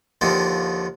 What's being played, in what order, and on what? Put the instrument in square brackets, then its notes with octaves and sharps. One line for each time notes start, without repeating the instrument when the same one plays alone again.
[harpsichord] D#2 D3 D#3 F3